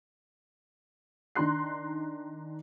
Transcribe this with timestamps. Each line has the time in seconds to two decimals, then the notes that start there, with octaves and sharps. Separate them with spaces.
1.36 D#3 D4 A#5 C6 F#6 C7